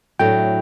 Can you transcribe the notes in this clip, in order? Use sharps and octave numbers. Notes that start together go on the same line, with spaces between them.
A2 F#3 A3 D4 G5